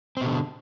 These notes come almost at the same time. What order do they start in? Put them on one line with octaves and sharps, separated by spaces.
C4 B2 D3